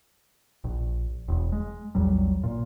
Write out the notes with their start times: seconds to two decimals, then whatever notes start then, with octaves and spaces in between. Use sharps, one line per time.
0.64 A#1
1.28 E1
1.52 G#3
1.95 A#1 E2 F#3 G3
2.44 A#2